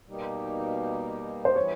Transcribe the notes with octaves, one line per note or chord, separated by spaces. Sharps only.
B2 G3 A#3 D#4 G4
C5
E3 G3 B3 C#5